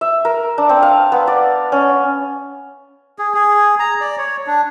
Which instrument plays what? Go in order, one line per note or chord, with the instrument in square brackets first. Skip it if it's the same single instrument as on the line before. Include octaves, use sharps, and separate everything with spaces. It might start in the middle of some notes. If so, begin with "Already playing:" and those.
[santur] E5
A#4
D4
C4
F5
B3
D5
C#4
[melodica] G#4
G#4
A#5
D5
C#5
D4